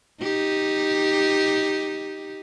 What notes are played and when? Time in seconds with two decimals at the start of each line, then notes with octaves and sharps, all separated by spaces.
0.22 D#4 G4